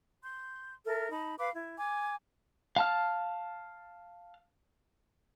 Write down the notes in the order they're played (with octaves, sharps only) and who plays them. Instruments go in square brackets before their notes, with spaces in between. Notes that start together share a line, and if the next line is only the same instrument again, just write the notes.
[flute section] C6 G6
A4 A#4 E5 F6
D#4 A5 B5
B4 F5 B5 D6
E4
G#5 D6 G#6
[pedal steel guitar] F5 A5 F6